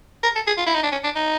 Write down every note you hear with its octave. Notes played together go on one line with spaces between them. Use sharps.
A#4
A4
G#4
F4
E4
D#4
D4
C#4
D4
D#4